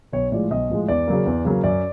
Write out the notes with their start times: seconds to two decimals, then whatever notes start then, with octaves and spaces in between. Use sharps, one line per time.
0.13 B1 C#5
0.32 A2 F3 G#3 D5
0.50 B1 D#5
0.70 A2 F3 G#3
0.88 E2 D5
1.07 C#3 F#3 A#3
1.26 E2
1.45 C#3 F#3 A#3
1.64 F#2 D5